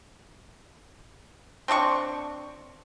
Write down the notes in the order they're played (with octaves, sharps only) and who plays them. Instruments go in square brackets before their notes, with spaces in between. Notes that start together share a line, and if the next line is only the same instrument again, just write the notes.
[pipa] C4 D4 D5 C#6